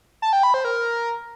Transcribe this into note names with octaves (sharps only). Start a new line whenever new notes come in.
A5
G5
B5
C5
A#4